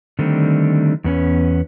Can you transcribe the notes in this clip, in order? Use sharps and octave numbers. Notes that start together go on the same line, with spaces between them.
D3 D#3 G3 A3 C4
E2 B3 C#4